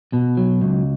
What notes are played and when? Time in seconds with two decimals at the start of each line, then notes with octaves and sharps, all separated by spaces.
0.13 B2
0.37 F#3
0.62 C#2